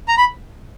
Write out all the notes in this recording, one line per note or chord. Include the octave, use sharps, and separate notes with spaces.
A#5
B5